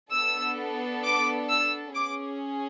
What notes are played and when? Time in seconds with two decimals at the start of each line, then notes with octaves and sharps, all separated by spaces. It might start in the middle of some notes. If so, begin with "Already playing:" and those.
0.12 B3 D4 A4 E6
1.04 D6
1.49 E6
1.95 C#4 G#4 D6